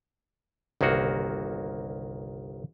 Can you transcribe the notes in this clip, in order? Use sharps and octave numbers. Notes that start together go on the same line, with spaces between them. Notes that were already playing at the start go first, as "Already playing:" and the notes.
G1 C2 D#3 A#3 F#4